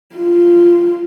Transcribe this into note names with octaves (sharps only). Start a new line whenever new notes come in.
F4